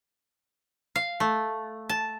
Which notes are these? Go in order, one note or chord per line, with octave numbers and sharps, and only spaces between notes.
F5
A3
A5